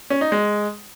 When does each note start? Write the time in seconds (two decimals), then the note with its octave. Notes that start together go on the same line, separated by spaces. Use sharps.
0.10 C#4
0.21 D#4
0.32 G#3